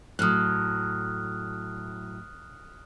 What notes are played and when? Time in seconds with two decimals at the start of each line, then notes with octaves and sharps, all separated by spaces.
0.19 A2 F#3 D#6 F6 F#6